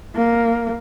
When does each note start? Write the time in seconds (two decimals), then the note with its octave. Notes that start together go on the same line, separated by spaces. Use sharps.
0.16 A#3